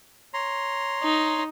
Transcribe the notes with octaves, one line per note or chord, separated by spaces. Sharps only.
C#5 A#5 C6
D#4